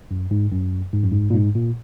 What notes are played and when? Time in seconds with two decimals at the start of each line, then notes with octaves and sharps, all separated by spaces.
0.11 F#2
0.31 G#2
0.52 F#2
0.93 G#2
1.03 F#2
1.12 G#2
1.30 A#2
1.34 G#2
1.55 A#2